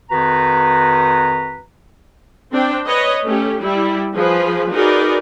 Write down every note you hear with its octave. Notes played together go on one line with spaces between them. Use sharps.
F2 D#3 F#4 B4 A#5
C4 D4 G5
B4 C#5 D#5
A3 C#4 G4
G3 E4
F3 G#4 B4
D#4 F#4 G#4 A#4 B4 D5